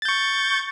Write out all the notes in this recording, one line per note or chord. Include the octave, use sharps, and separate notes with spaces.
C#6 G6 A6